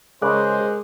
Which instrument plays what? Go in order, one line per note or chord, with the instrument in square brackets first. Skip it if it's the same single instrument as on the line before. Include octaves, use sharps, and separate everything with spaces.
[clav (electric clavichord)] C#3 [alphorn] G#3 [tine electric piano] A#4 D6 F#6 [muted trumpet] C5